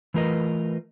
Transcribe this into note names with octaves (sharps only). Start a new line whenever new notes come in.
E3 A3 F4 A#4 B4 D#5